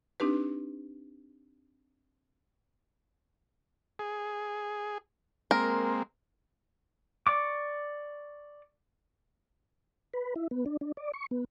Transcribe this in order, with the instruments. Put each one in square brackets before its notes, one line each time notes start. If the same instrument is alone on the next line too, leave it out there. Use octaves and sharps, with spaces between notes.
[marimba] C4 D4 D#4 G4 B4
[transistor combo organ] G#4
[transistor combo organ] G#3 A#3 C4 [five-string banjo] A#4
[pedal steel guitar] D5 C#6 D6
[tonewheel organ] B4
E4
B3
D4
D4
D5
C#6
B3